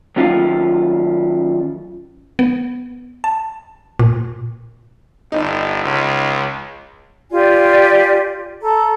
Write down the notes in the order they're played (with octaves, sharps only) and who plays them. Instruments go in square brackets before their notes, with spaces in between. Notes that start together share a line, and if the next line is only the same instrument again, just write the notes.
[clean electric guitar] D#3 F#3 C#4 F4 F5
[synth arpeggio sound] B3
A5
A#2
[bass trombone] G1 [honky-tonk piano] D#4
[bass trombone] C#2
[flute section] F4 G4 D5 G#5
A4 A#5